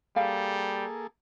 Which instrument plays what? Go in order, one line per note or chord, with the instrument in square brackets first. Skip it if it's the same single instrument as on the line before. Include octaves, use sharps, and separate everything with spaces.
[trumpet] G3 [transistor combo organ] A#3 G#4 A4 [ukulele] F5